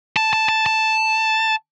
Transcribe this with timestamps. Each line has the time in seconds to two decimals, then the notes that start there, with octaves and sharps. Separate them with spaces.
0.16 A5
0.33 A5
0.49 A5
0.66 A5